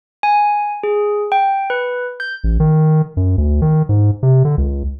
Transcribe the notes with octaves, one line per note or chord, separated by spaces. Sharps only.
G#5
G#4
G5
B4
G6
A1
D#3
F#2
D2
D#3
G#2
C3
D3
C#2